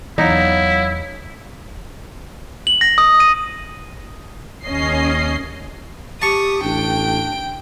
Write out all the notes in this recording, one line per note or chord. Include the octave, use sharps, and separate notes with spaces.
E2 F#3 D#4 E4 C#5 F5
F#7
A#6
D#6
D#7
D#2 C#4 D#5 C7
G4 A5 C#6 D#6
A1 D4 G5 D7